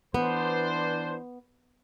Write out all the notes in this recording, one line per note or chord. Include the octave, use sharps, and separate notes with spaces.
E3 B3 D4 C5